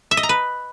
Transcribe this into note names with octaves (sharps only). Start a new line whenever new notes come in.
E5
D#5
A#5
B4